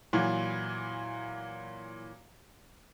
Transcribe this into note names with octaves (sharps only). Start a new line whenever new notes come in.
A#2 E3 F#3